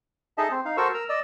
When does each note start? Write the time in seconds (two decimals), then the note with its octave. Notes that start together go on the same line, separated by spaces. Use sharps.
0.38 D#4 G#4 A4 D#5 E5 A5
0.51 C4 C5
0.65 D#4 F5
0.77 F#4 A4 A#4 C5 C#6 E6
0.94 A#4 A#5 E6
1.09 D5 D#5 E6